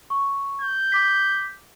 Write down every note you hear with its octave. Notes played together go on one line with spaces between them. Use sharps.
C#6
G6
D6 B6